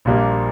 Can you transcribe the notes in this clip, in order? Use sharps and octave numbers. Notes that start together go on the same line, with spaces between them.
A#1 A#2 G3 A#3 D4